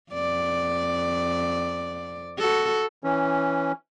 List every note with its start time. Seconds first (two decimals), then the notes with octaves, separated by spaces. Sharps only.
0.12 F2 D5
2.38 F#4 A4
3.04 E3 C#4